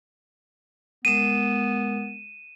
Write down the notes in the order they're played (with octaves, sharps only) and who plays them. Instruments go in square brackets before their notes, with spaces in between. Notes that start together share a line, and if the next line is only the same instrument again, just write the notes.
[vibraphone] G#3 A#4 [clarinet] B3 [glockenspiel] D#7 E7